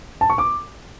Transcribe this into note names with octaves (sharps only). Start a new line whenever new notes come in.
A5
C#6
D6